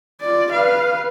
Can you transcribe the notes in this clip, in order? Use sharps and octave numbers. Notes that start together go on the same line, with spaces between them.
F4 D5
B4 F5